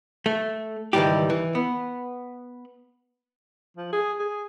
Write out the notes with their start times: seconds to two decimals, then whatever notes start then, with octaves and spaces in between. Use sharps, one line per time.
0.26 A3
0.93 C#2 G#2 D#3 E3 G3 G4
1.30 E3
1.55 B3
3.77 F3
3.92 G#4
4.19 G#4